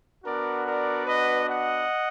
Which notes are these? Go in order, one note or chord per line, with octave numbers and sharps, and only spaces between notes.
B3 D4 F#4 A#4 D5
A#4 D5
B4 D#5
D#5 F#5